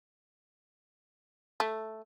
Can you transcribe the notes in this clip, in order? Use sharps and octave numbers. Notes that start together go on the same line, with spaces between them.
A3